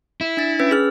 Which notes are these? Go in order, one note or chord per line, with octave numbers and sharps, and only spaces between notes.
E4
D4 A6
C#4 B4 E6
G#4 F6